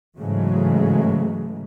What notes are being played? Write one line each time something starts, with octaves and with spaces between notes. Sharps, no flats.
G#2 C#3 E3 F#3 G#3 A3